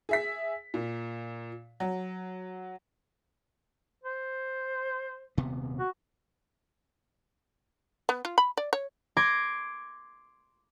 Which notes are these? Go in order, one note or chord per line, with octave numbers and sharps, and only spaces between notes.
G#4 E5 B6
A#2
F#3
C5
D#1 C3 B3
F#4
B3
F4
B5
D5
C#5
C6 D6 G#6 A#6 C7